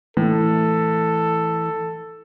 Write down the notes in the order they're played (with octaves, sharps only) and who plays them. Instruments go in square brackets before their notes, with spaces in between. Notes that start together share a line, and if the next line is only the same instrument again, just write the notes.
[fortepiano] A2 [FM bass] E3 [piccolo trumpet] A4